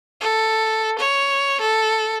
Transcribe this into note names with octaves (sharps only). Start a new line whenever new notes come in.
A4
C#5
A4